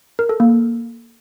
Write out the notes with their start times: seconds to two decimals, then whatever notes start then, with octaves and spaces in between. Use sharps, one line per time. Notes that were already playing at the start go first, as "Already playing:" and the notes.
0.19 A#4
0.29 A4
0.40 A#3